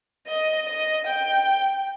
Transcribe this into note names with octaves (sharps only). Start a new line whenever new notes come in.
D#5
D#5
G5